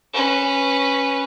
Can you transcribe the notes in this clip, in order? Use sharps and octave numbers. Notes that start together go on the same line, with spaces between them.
C#4 B4